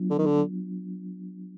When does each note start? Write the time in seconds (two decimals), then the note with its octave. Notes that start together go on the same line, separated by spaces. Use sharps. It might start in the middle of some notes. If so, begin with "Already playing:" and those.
Already playing: F#3 B3 D4 F4
0.10 D3
0.18 D#3
0.26 D3